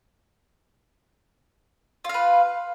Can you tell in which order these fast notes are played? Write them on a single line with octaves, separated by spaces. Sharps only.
F4 F5 B4